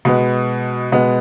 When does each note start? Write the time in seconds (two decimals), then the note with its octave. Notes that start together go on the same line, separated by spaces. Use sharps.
0.05 B2 G#3 B3
0.92 B2 G#3 B3